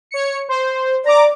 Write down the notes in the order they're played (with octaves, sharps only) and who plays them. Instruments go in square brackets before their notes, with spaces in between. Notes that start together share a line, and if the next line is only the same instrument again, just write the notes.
[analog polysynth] C#5 C#7
C5
[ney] D5 [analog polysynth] A#5 D6